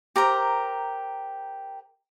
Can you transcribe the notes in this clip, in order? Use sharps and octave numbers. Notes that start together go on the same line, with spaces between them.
G4 A#4 C5 A#5